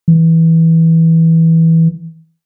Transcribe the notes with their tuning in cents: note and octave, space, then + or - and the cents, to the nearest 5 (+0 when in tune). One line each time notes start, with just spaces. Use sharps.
E3 -15